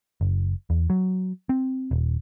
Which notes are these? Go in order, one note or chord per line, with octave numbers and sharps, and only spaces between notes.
F#1
E2
F#3
C4
D#1